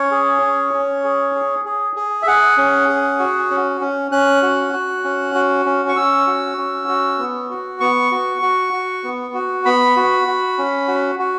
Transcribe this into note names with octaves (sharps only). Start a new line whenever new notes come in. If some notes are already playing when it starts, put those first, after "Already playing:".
Already playing: C#4 C#5
G#4
C#4
C#4
G#4
G#4
G#4
G#4
E5
G#4 F#5
C#4
G#4
F#4
C#4
C#4
C#4 F#6
F#4
F#4
C#4
F#4
C#4
C#6
C#4 E6
F#4
C#4
F#4
B3
F#4
B3 C#6
F#4
F#4
F#4
B3
F#4
B3 B5
F#4
F#4
C#4
F#4
F#4